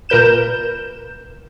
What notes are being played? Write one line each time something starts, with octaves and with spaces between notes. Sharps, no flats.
A#2 A#4 B4 G6 E7